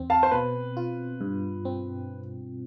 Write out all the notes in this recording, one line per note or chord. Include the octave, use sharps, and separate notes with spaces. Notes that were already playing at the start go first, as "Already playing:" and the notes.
Already playing: E2 C4
F5 A5
C5
B2 B4
F4
G2
C4